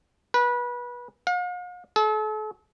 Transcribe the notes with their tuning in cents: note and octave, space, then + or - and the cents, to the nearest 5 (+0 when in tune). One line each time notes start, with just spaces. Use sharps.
B4 -25
F5 +45
A4 -40